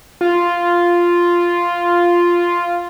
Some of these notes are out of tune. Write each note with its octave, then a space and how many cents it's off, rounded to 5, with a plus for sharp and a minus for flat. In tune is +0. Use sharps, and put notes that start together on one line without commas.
F4 -5